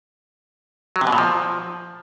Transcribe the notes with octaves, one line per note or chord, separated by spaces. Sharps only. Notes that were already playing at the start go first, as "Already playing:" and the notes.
F#3
C3
B2
A#2
F3